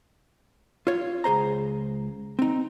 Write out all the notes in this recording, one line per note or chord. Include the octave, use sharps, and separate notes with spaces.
F4 C#5
C#2 G#4 C5 A#5
C4 D#4